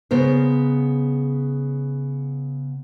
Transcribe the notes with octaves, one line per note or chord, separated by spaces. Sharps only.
C#3 B3 A#4 C5